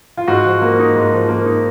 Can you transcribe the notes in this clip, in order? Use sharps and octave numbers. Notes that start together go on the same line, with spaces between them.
F4
G#2 F#4
F3
A#3
D#4
G#2
F3
A#3
D#4